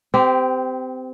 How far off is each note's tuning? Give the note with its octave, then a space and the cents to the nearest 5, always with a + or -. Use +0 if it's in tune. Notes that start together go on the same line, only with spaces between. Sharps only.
C4 -25 G4 +5